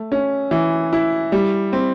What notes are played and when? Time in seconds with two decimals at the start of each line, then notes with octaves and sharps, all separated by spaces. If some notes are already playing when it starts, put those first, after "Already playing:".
Already playing: A3
0.12 C#4
0.51 E3
0.93 E4
1.32 G3
1.73 C4